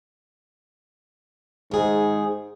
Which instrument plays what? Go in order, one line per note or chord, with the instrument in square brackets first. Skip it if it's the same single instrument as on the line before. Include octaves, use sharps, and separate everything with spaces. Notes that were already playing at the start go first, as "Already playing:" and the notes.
[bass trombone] G#2 [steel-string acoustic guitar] D#3 G#4